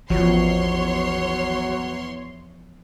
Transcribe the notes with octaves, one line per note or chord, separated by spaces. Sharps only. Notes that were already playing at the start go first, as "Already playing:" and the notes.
A1 E2 F3 F#3 C#5 C6